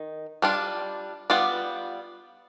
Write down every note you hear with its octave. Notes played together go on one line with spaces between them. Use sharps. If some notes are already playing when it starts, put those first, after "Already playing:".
Already playing: D#3
G3 D4 F4
G3 B3 F4 D5